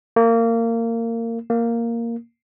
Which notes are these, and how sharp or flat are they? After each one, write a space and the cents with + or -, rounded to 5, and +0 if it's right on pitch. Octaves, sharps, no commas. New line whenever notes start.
A#3 -25
A#3 -5